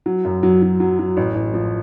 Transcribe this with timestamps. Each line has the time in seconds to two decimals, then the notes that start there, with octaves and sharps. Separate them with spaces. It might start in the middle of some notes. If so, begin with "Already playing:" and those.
0.06 F#3
0.25 F#2
0.43 F#3
0.62 F#3
0.80 F#3
0.99 F#3
1.17 A1
1.35 A1
1.54 F3